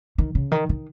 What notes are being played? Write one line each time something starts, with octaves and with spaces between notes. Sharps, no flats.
D#3
C#3
D#3
D#3